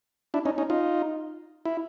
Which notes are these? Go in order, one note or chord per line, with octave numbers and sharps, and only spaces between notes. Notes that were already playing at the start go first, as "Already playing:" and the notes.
D4 E4
C#4 D#4
C#4 D#4
D#4 F4
E4